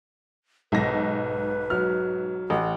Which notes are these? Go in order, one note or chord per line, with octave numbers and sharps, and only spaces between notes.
B1 G#2 B4 A#6
F#3 F6
A1 F#5